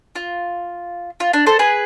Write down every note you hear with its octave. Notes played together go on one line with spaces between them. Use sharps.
F4
F4
D4
A4 C5
G#4 B4